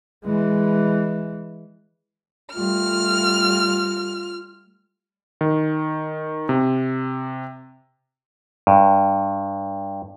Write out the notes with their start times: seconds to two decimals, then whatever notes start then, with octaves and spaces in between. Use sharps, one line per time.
0.24 E3 G#3
2.55 G3 A3 F4 F6
5.41 D#3
6.49 C3
8.67 G2